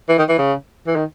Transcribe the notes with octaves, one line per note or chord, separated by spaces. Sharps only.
E3
D#3
E3
C#3
E3
D#3